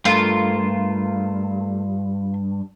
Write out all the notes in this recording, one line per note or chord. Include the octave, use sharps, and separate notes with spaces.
G2 A3 F4 A4 A#4